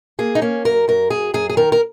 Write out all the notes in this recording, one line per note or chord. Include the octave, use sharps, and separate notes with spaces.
A#3 G#4
D#4
A#3 C#4
F#2 A#4
F#2 A#4
F#2 G#4
F#2 G#4
G#4
D#3 A#4
A#4